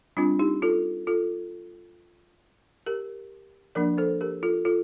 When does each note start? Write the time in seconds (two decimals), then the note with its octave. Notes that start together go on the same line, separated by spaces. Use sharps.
0.17 G3 C4 D4 F4
0.39 D#4 G4
0.62 F4 A4
1.07 F4 A4
2.86 G4 A#4
3.75 F3 A#3 D4 A#4 D5
3.98 A4 C5
4.21 G4 A#4
4.43 F4 A4
4.65 F4 A4